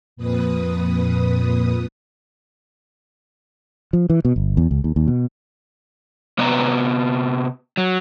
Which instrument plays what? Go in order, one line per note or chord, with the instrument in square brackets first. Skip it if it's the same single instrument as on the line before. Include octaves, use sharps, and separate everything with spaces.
[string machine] F2 A#2 B4 D#6
[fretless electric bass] F3
E3
B2
G1
E2
C#2
D#2
D#2
B2
[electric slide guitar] C3 B3 B4 D5 D#5 A#5
F#3